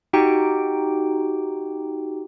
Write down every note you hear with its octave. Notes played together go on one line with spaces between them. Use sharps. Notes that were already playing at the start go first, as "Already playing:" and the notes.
D#4 F#4 G4 G5